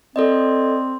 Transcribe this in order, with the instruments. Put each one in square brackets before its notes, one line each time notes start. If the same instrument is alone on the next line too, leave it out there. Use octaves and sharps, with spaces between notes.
[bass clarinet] C4 [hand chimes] A4 D5 D#5